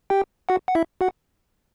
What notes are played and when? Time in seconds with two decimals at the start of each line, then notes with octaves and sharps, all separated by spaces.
0.10 G4 G5
0.49 F#4 F#5
0.68 F#5
0.75 E4 E5
1.01 F#4 F#5